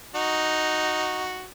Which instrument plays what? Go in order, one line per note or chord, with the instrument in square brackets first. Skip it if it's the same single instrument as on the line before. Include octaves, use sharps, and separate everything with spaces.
[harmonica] D#4 F#4